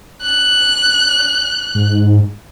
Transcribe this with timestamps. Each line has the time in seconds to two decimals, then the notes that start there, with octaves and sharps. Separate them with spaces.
0.23 F#6
1.75 G#2